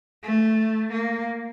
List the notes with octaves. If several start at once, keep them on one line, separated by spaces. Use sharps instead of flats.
A3
A#3